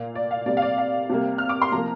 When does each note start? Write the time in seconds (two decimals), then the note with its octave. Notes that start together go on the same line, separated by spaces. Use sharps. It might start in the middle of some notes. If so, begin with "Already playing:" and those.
Already playing: A#2 A#3 F5
0.15 D5
0.31 F5
0.46 C3 G3 A#3 D5
0.57 F5
0.62 D5
0.78 F5
1.10 C3 G3 A#3
1.38 F6
1.49 D6
1.62 C6
1.72 C3 F3 A#3 A#5